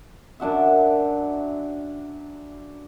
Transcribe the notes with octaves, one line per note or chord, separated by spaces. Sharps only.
F#2 D4 F#4 E5